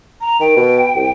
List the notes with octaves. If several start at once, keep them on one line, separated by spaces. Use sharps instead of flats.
A#5
D#3 G5
B2
C2